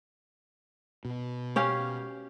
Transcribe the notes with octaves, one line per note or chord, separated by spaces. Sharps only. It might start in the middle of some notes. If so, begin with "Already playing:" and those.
B2
C#4 G4 F5